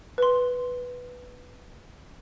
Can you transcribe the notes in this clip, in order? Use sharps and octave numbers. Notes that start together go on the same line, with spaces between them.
B4 C6